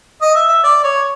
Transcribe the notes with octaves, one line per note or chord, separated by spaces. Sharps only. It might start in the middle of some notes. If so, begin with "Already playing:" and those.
D#5
E5
E5
D5
C#5